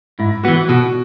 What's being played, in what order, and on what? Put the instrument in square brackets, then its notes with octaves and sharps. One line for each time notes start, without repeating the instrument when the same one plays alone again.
[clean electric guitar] G#2 [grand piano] E4
[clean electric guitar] E3 B3 [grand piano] F#4
[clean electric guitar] B2 [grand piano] F#4